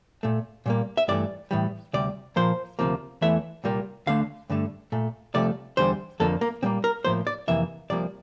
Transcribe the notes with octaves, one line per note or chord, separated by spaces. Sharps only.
A#2 A3
A#2 G3 A#3
E5
G2 E3 A3 D5
A2 E3 G3
D2 C3 G3 D5
A#2 F3 A#3 C5
D2 C3 F3 A#3
E2 E3 A3 E5
C2 A#2 G3 A#3
D2 D3 A3 F5
G2 D3 A3
A#2 A3
C2 C3 F3 A3 D5
E2 D3 G3 C5
F2 D3 F3 A#3 A4
A#3
A#2 G3 A#3 C4
A#4
A2 F3 A#3 C5
D5
F2 C3 E3 A#3 E5
C2 C3 F3 A#3 D5